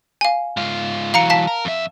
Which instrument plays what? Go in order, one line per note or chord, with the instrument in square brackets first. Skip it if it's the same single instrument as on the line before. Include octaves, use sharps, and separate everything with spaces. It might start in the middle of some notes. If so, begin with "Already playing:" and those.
[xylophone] F5 G#5
[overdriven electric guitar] G#2 F4
[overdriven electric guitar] E3 F#3 [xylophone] F5 A#5 C#7
[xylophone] F5 A5 B6
[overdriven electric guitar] A#4
F2 E5